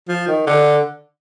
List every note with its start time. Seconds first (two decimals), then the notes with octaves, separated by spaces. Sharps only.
0.08 F3
0.27 D#3
0.47 D3